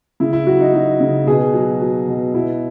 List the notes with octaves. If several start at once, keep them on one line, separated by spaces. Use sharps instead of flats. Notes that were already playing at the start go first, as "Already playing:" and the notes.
C#3 E4
E4
F#3 F#4
D#4
F#3 D#4
C#3
B2 G#4
F#3
F#3
B2
B2 E4